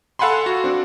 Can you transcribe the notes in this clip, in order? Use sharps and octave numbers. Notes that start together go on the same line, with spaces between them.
A4 F5 F#5 G#5 B5 C6
F#4
C4 D4 F#4